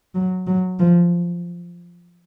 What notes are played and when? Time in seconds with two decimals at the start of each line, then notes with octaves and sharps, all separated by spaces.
0.15 F#3
0.47 F#3
0.80 F3